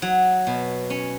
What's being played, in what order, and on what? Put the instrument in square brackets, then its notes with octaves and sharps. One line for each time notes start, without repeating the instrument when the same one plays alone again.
[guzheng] F#3
B2
C#4